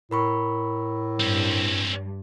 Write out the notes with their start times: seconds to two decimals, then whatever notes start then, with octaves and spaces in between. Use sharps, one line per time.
0.11 A2 A#4 B5 C#6
1.20 G2 C4 C#4